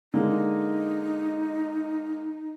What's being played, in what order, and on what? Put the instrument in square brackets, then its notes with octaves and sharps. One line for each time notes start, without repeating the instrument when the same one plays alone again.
[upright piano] D3 G#3 A#3 [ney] D#4